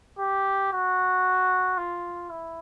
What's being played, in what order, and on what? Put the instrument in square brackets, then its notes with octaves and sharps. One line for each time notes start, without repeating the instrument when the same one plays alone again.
[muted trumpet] G4
F#4
F4
E4